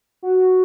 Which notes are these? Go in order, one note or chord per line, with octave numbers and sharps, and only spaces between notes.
F#4